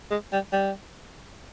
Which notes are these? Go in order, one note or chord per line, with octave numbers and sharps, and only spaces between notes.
G#3
G3
G3